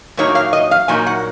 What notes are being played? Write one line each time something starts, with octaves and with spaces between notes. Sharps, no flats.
A#2 F#3 A#3 D#4 C#5
F5
D#5
F5
A#2 F#3 A#3 D#4 G#5
F#5